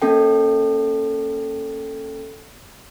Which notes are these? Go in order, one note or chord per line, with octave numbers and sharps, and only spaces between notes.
A#3 C#4 A4 G5